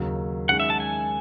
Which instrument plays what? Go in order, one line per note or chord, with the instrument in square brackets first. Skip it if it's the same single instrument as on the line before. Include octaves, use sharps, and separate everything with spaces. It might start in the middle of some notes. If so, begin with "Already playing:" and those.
Already playing: [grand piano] D#2 C#3 F#3
[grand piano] D#3 G#3 C#4 [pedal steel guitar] F#5
[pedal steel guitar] E5
A5
G#5